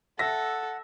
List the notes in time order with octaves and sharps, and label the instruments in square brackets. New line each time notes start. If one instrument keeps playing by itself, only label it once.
[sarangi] A4 [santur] E5 [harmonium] F#5 [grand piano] A#6